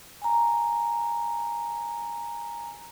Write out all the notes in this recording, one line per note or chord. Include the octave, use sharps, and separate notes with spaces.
G#5 A#5